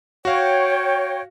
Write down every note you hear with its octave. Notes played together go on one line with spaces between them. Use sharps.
F#4 C#5 F5 G5